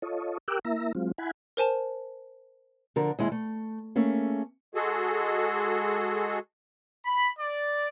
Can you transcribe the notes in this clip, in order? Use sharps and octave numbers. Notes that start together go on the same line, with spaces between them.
F4 A4 C#5 D#5
G4 A#4 G5 D6 E6 F#6
A#3 E4 E5 A#5
F#3 G#3 C4 F4
E4 F#5 G#5 B5
A#4 C5 G#5 A5
D3 F3 A#4
D#2 G#3 E4
A3
A3 A#3 C#4 G#4
G#3 F#4 G#4 A4
B5
D5